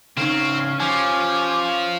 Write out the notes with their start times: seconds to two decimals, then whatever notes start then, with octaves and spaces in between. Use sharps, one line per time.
0.17 C#3 C4 C#4 D#4 F5
0.80 F3 G4 G#5